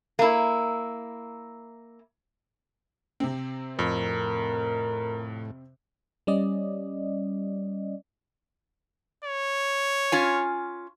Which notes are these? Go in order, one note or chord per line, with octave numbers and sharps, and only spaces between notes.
A#3 E4
C3 C4
F2 A2 A#4
G3 C#4 D5 D#5
C#5
C#4 F4 G#5